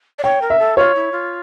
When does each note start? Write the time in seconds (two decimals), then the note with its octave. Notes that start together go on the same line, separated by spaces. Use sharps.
0.19 D5
0.23 C#5 G5
0.42 A#4
0.50 E5
0.59 A4
0.77 F4 C#5
0.95 E4
1.12 F4